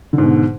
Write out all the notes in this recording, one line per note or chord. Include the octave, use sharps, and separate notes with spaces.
G#2 B2 D3